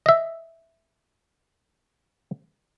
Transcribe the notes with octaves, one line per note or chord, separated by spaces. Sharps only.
D#5 E5